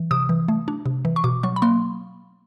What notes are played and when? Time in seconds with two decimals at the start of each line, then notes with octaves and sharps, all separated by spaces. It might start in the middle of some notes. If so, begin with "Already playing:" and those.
Already playing: E3
0.11 C3 D#6
0.29 E3
0.48 A3
0.68 D4
0.86 C3
1.05 E3
1.16 C#6
1.24 B2 D6
1.43 F#3 C#6
1.56 B5
1.62 A#3 C6